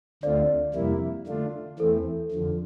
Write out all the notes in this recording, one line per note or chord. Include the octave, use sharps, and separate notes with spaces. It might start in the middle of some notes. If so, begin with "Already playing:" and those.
D2 D3 A3 C4 F4 D5
F2 C3 G3 A#3 E4
D3 A3 D4 F4
E2 E3 A3 C4 A4
F2 D3 F3